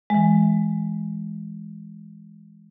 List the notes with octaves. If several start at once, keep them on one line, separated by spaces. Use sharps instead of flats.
E3 G#3